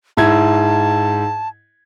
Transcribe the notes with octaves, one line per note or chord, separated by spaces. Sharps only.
G#2 E4 A5 G#6